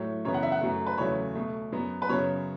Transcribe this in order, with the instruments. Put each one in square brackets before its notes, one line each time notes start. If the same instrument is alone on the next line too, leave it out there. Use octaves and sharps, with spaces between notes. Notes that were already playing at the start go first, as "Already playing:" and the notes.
Already playing: [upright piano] A2 F#3 A3 C#5
F#2 C#3 E3 B3 C#5
F#5
E5
F#5
F#2 F#3 A3
B4
E2 C#3 F#3 A3 C#5
B2 A3
F#2 F#3 B3
B4
F#2 C#3 F#3 B3 C#5